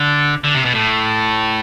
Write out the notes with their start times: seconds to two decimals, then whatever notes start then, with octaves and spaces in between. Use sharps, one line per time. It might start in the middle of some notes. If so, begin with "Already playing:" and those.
Already playing: D3
0.44 D3
0.55 C3
0.65 B2
0.74 A2